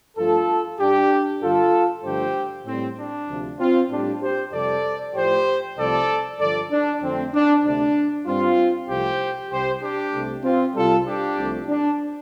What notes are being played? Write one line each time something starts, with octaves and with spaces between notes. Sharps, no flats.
G2 F3 A3 F4 A4
G2 G3 D4 G4
G2 D3 G3 F4 A4
G2 D3 F3 A3 G4 C5
A2 G3 C4
D4
D2 C3 F3
C4 F4
A2 G3 D4 G4
G4 C5
F2 C3 G3 A4 D5
A2 F3 A3 G4 C5
C2 C3 F3 A3 A4 D5
G2 D3 F3 A4 D5
D4
F2 D3 A3 C4
D4
D2 C3 A3 D4
G2 G3 C4 F4
C2 C3 F3 A3 G4 C5
C2 C3 G3 G4 C5
D4 G4
C2 C3 A3
C4 F4
C2 C3 G3 F4 A4
D4 G4
C2 C3 F3 A3
D4